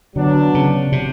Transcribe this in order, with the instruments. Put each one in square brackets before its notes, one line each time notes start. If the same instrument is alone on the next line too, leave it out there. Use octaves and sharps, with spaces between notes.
[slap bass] D3 [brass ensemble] F#3 B3 D4
[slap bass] C#3
C3